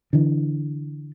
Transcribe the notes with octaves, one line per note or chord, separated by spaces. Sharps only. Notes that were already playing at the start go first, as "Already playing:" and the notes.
D3 E3